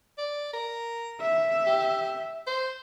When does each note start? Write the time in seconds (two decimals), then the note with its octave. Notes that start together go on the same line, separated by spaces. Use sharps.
0.18 D5
0.54 A#4
1.21 E5
1.67 G4
2.47 C5